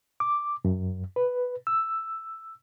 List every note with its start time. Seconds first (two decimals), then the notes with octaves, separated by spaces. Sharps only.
0.20 D6
0.65 F#2
1.16 B4
1.67 E6